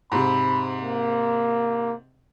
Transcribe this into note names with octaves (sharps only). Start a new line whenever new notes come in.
G#2 C3 B5
A#3